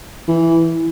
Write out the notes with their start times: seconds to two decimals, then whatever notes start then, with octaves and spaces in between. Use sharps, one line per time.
0.28 E3